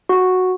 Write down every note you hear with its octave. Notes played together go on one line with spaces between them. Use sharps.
F#4